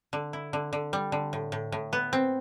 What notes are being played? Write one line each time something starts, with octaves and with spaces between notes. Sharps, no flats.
D3
E4
D3
D3
G3
D3
A2
A2
A2
B3
C4